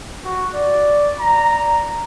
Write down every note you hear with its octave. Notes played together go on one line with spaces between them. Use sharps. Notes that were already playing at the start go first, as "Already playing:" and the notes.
F#4
D5
A#5